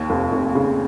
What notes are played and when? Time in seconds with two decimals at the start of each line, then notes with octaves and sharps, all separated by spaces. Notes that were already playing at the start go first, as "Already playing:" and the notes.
Already playing: D#2
0.10 F1
0.32 F1
0.55 C#3